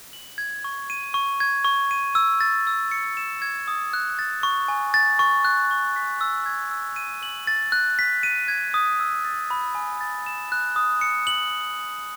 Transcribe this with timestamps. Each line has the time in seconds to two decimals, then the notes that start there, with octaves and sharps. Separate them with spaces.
0.13 F#7
0.38 G#6
0.64 C#6
0.90 D#7
1.14 C#6
1.40 G#6
1.65 C#6
1.91 D#7
2.15 E6
2.41 A6
2.67 E6
2.91 C#7
3.17 E7
3.42 G#6
3.68 D#6
3.93 F#6
4.19 A6
4.43 C#6
4.68 G#5
4.94 A6
5.19 C#6
5.45 F#6
5.71 C#6
5.96 B6
6.21 E6
6.46 G#6
6.71 E6
6.96 D#7
7.23 F#7
7.47 A6
7.72 F#6
7.99 B6
8.23 D#7
8.48 G#6
8.74 D#6
9.00 E6
9.25 A6
9.51 B5
9.75 G#5
10.01 A6
10.26 E7
10.52 F#6
10.76 D#6
11.01 C#7
11.27 F#7